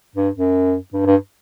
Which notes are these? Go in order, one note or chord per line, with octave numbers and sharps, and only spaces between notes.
G2
F#2
G2
G2